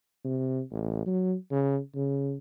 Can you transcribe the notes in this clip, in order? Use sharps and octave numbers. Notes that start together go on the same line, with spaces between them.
C3
A1
F#3
C#3
C#3